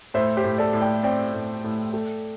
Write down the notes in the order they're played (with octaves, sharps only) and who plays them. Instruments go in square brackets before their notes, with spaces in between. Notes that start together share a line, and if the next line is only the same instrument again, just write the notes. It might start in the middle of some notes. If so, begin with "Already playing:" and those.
[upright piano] A2 C5 E5
G4 C5
A2
A4 D5
A2
D5 G5
C4 D5 G5
A2
A2
A3